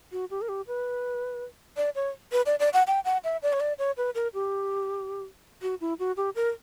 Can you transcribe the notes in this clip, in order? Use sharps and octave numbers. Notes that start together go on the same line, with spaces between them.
F#4
G4
A#4
G4
B4
D5
C#5
B4
D5
D5
F#5
G5
F#5
E5
D5
C#5
D5
C#5
B4
A#4
G4
F#4
E4
F#4
G4
A#4